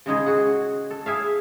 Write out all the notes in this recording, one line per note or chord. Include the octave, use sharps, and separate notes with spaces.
C#3 G#3 D#4 G#4
F#4 G#4 F#5
A4
E4 G#4 E5 F5